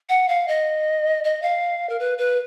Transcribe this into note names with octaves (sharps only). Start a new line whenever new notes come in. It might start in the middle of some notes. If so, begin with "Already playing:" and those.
F#5
F5
D#5
D#5
F5
A#4
B4
B4